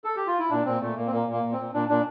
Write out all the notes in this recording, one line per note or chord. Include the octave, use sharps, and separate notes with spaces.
A4
G4
F4
E4
A#2 D4
A#2 C4
A#2 A3
A#2 A#3
C4
A#2 A#3
A#2
A#3
A#2
C4
A#2
A#2 D4
A#2 D4